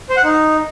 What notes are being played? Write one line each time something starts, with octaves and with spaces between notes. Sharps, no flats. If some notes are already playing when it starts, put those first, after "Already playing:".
C5
F#5
D#4